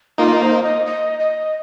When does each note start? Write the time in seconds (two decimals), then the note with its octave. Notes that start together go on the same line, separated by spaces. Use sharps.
0.18 A#3 D#4 F4
0.41 C5
0.63 D#5
0.86 D#5
1.20 D#5